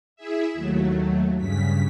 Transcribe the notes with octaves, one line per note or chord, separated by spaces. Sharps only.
E4 G#4 E5
D#2 F#3 A3
G2 C#3 B6